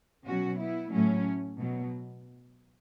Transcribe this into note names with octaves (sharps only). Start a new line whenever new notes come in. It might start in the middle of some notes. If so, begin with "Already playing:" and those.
B2 F#3 C#4 F#4
B3 E4
A2 F#3 A3 C#4
B2 F#3